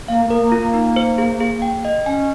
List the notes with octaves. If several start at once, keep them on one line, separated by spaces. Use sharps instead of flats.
A#3 F5
A#3
A#4
A#3
F4
A#3
D#4
C5
G#4
G#4
G5
D#5
C#4 G#5